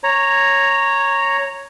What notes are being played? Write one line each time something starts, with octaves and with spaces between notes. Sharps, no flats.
C#5 A#5